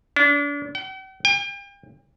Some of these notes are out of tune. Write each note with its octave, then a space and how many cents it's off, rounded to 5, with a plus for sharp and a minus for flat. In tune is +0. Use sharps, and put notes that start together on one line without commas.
D4 -35
G5 -45
G5 +40